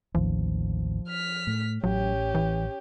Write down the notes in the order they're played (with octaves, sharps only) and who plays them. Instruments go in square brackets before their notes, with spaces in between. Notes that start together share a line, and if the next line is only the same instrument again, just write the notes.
[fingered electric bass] A1 D#2 [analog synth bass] F3
[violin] F6 B6
[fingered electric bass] A2
[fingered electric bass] A1 [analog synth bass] F#3 [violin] C#4 G4
[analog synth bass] E3